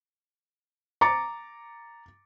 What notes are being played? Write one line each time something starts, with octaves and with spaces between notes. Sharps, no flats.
A#5 D6 A6 C#7